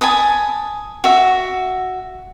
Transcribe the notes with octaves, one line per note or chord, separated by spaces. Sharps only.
G#5 A5 B5 D#6
F#4 E5